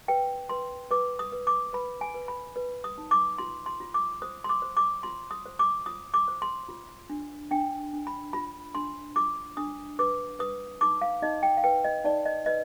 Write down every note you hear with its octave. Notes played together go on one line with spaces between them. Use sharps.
B4 G5
B4 C6
B4 D6
D#6
B4
D6
B4 B5
G#5
B4
B5
B4
D#6
D#4
D6
F4 C6
C6
F4
D6
C5 D#6
C6
D6
C5
D6
F4 C6
D#6
C5
D6
F4 D#6
D6
C5
C6
F4
D4
D4 G5
D4
B5
F4 B5
D4 C6
F4 D6
D4 D#6
B4 D6
B4 D#6
D#4 D6
F5
D#4 D#5
G5
F5
B4 G5
D#5
D#4 D5
D#5
B4 D#5